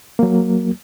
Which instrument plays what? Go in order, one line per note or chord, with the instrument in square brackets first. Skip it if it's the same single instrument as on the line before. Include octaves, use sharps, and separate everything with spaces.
[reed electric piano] F#3 A#3